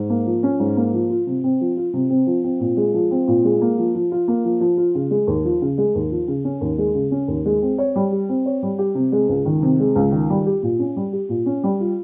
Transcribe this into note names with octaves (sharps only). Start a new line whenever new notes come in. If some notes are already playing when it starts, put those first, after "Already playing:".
Already playing: G#2
A#3
F3
C#4
G#2
A#3
F3
F4
C3
C4
F3
F4
C3
C4
F3
C4
A#2
G#3
F3
C4
A#2
G#3
A#3
F3
F3
F4
A#3
F3
F3
F4
C#3
G#3
D#2
F3
C#3
G#3
D#2
F3
C#3
C#4
D#2
G#3
C#3
C#4
D#2
G#3
C4
C#5
G3
G4
C4
C#5
G3
G4
C3
G#3
C#2
D#3
C3
G#3
C#2
D#3
G3
G4
A#2
C#4
G3
G4
A#2
C#4
G3
F4